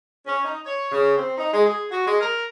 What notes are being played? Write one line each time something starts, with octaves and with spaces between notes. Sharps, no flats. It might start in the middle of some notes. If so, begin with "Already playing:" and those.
C#4
D#4
C#5
C#3
C4
D#4
G#3
G#4
F#4
G#3
A#4